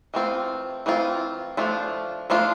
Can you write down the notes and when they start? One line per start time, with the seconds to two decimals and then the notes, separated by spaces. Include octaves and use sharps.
0.14 E3 A3 C4 F4
0.86 E3 A3 C4 F4
1.57 F3 A3 D4 F4
2.30 F3 A3 D4 F4